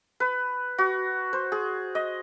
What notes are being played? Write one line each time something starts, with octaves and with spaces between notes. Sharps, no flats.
B4
F#4
C5
G#4
D#5